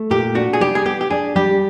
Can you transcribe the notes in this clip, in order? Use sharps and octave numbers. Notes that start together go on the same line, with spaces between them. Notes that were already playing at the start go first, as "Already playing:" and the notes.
Already playing: A3
A#2 G4
D4 F#4
G#4
G3 G4
G#4
B3 G4
G4
D4 G#4
G3 G4